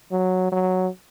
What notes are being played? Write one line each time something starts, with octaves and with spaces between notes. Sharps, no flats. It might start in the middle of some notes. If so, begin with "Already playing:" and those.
F#3
F#3